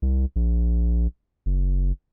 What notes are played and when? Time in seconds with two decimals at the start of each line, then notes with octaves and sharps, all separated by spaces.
0.02 C2
0.36 A#1
1.46 F#1